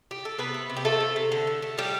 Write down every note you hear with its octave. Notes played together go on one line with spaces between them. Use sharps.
G4
A4
C3 B3 B4
A3
C3
G4
F3 A3 A4
A3
C3
D3
A3
A3
F3 G3 G4